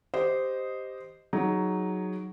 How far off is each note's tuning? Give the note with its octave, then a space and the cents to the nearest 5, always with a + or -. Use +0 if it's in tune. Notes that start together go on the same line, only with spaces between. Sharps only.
G4 +0 C5 -10 D#5 +0
F#3 +0 D#4 +0 G#4 +0